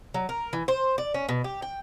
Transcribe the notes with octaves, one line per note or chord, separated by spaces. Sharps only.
F#3
A#4
E3
C5
D5
C#4
B2
G4
G5